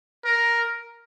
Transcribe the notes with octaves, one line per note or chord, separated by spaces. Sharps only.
A#4